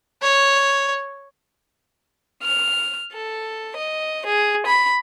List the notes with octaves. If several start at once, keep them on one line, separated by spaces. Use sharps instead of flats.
C#5
F6
A4
D#5
G#4
B5